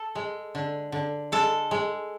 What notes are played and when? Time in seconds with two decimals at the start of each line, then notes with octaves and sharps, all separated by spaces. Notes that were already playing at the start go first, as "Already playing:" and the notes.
Already playing: A4
0.15 G#3
0.55 D3
0.92 D3
1.32 G#3 A4
1.71 G#3